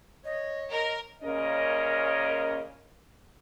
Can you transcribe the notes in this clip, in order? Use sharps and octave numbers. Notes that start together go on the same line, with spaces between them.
C#5 D#5
A#4 D#5
A#2 C#3 C#4 A#4 D#5